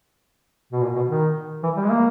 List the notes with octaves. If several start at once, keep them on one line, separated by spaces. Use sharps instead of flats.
B2
A#2
B2
D#3
E3
G3
G#3
A#3